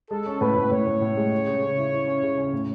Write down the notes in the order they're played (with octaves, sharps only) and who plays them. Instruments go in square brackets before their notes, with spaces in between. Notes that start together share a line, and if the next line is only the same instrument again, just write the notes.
[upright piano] G#3 [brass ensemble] A4
[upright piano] C#4
[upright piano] A2 [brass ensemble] B4
[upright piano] A2
[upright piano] A2 [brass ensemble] C#5
[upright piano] A2
A2
G#3
C#3
C#3
C#3
E4
E4
C#4
C#3
C#4
A2